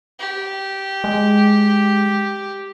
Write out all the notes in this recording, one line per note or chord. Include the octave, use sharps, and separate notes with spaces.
G4
G#3